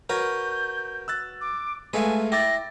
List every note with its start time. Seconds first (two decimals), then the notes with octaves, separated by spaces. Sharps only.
0.09 F#4 A#4 B4 C#5 G6
1.08 E6 F#6 A6
1.41 D6
1.93 G#3 A3 B4 E5 F5 G#5
2.32 E4 G5 D6 A6 A#6